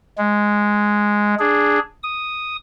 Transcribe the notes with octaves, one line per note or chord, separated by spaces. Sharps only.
G#3
D4 G#4
D#6